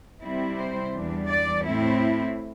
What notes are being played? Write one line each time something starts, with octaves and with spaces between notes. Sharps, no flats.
C3 G3 C4 E4
C5
E2 E3 G3 D4
D5
A2 A3 C4 E4